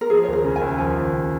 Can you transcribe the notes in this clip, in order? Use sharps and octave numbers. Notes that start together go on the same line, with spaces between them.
A#4
F3 G#4
C#5
D#2 A#4
C#3
G#5
D#2
F3 G#5
D#2
C#3